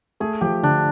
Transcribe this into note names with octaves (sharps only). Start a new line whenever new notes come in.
A3 G#4
F3 G4
D3 D4